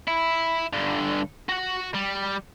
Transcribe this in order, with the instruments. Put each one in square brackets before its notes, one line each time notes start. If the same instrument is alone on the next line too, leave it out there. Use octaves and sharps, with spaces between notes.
[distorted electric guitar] E4
G2 D3
F#4 F#5
G3